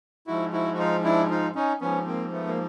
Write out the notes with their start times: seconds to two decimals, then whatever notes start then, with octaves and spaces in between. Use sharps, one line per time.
0.27 G#2 F3 E4 F#4
0.52 E4 F#4
0.74 F#4
0.78 D#4 F4
1.04 D4 E4
1.30 D#4 F4
1.55 C#4 D#4
1.81 G#2 F3 B3 C#4
2.07 A#3 C4
2.32 A3 B3
2.47 A#3